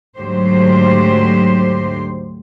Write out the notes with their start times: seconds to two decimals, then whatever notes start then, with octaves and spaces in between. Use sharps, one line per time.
0.18 D2 G#2 D3 F#3 G4 C5